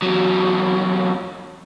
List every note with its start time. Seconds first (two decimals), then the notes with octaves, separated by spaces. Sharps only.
0.02 E2 F#3